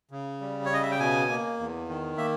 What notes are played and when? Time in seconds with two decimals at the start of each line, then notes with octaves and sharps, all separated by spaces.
0.11 C#3
0.41 G3
0.65 C#5
0.70 C#3 D#5
0.82 E5
0.91 G5
0.99 B2 G#5
1.29 A#3
1.58 E2
1.88 D#3
2.17 A#3 E5